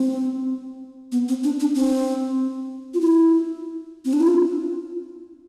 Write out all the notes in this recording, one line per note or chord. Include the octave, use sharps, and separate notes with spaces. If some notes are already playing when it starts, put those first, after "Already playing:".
Already playing: C4
B3
C4
D4
D4
C4
F4
E4
C4
D4
E4
F4